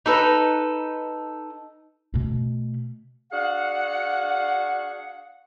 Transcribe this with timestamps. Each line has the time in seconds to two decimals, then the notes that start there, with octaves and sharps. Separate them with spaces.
0.06 D#4 A4 B4
2.14 B2 A3
3.31 D4 F#4 G#4 F5 F#5